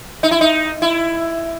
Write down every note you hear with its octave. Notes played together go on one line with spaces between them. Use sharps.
D#4
E4
D#4
E4